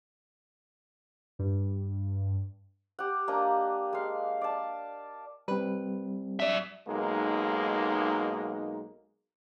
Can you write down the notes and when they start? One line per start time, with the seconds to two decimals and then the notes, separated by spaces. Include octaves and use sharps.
1.39 G2
2.99 G4 F#5
3.28 A#3 D4 D#5 A#5
3.93 G#3 F5
4.41 D5 A5
5.48 G3 C4 B4
6.40 F#3 D4 D5 E5
6.88 B1 G#3 A#3 D#4